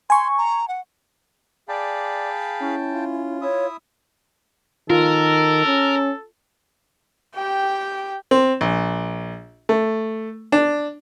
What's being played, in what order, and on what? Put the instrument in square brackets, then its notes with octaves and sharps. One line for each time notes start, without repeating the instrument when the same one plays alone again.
[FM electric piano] G#5 C#6 [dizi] C6
[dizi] A#5
F#5
[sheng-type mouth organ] G#4 F5 B5 [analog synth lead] D5 [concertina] G5 A5
[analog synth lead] C#4 [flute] E4
[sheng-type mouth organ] F4
[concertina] E4 E5 D#6 [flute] C#5
[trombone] D#3 [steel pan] F4 [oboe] A4 [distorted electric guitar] A#4
[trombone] C#4
[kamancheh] G4 G5
[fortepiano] C4
A#1
A3
D4